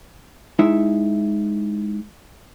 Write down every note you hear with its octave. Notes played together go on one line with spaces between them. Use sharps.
G#3 D#4 E4 E5